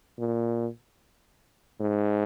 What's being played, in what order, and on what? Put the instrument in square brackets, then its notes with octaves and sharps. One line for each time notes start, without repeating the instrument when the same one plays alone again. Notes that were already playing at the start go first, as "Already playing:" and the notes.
[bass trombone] A#2
G#2